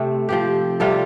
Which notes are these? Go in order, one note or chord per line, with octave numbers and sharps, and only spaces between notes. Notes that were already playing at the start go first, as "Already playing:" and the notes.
Already playing: C3 A3 C4
F3 C4 G4
C3 G3 F4 A4